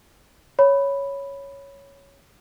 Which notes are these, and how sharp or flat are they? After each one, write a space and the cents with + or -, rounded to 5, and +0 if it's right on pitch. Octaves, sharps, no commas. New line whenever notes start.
C#5 +0 B5 +0